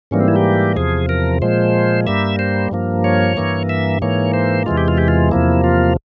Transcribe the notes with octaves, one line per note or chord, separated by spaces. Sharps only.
G#2 E3 G3 A#3 C#4
C4
E4
G4
E2 C3 F3 G#4
A#4
A#2 F3 G#3 C5
G2 G3 A#3 E5
C5
G2 F3 A#3
C#5
G2 E3 A#3
E5
G#2 E3 A#3 C#5
C5
E2 C3 E3 G#3 F4
G4
F4
G4
F4
E2 C3 F3 A#3 E4
F4